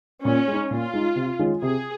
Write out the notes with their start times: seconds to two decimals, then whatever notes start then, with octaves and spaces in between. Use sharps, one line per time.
0.25 A#2 C#4
0.48 G#3
0.53 D#4
0.71 A#2 F4
0.93 G#3 D#4
1.16 C3
1.39 D#3 G#3 C#4 F4
1.62 C3 G#4